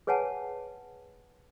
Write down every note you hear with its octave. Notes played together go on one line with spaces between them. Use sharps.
G#4 B4 C#5 F#5 G#5 A5